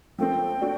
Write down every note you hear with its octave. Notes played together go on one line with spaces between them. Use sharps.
F3 A3 C4 G5
A3 D4 F#4